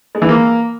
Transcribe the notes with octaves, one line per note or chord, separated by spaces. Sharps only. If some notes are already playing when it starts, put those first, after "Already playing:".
G#3
E3
A#3